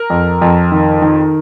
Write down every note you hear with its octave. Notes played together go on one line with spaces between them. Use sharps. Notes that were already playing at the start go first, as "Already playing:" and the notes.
Already playing: A#4
F2
F2
D#3
D#3